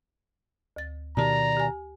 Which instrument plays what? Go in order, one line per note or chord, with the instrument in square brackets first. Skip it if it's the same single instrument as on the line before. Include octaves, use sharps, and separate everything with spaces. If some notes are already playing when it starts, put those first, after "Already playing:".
[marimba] D2 A6
[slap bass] B2 D#3 [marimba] G4 A5 [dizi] D5 [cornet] A#5
[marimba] G4 G#5